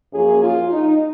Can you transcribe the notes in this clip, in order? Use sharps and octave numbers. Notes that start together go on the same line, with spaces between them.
F#2 F3 A#3 C#4 G#4
F4
D#4